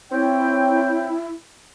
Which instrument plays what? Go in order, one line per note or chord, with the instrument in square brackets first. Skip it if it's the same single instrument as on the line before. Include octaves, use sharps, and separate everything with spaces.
[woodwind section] C4 C#5 G5 [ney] E4